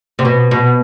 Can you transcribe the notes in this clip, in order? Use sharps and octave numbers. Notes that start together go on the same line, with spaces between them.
C3
B2
B2